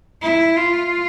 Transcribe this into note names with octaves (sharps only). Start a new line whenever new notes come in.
E4
F4